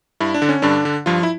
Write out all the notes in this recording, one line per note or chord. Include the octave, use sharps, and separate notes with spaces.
G2 E4
D4
D3
C#4
G2 D3 D4
D3
G2 F3 F4
E4